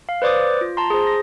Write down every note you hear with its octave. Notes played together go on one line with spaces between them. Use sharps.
F5
B4 C5 D5 D6 D#6
F4
A5 A#5 C6
G#4 C5
A#6